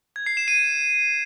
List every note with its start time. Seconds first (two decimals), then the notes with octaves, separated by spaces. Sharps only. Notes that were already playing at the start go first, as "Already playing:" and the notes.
0.16 G#6
0.26 C7
0.37 E7
0.48 D#7